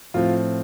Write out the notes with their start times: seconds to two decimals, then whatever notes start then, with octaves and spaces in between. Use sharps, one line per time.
0.14 A2 F3 C4 F4